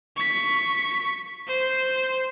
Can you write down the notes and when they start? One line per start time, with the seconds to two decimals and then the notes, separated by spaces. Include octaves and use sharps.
0.17 C#6 B6
1.47 C5